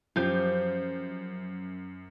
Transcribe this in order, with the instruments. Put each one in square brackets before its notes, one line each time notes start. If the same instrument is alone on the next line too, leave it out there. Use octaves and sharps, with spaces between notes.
[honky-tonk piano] F#2 G6 [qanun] F3 G4 F5